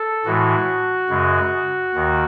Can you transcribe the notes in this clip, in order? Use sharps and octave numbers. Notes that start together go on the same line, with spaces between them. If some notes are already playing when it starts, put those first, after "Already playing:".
Already playing: A4
A2 E3 G#3 F#4
F#2 C#3 G#3
D#2 D#3